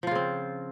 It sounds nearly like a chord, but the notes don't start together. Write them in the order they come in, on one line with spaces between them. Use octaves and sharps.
F3 F4 C#3 C4